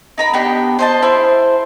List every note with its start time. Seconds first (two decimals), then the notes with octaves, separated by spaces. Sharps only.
0.18 D#4 A#4 B5
0.33 B3 D4 G4
0.79 C5 D#5 A5
1.02 E4 G#4 C5